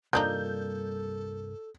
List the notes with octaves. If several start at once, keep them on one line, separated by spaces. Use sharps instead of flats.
C2 G2 F3 A#3 D4 D#4 A4 G6